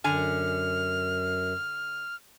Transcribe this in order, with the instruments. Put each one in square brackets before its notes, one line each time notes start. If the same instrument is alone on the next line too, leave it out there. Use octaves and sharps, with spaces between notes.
[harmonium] F#2 [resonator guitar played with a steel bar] D3 G#5 [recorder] F6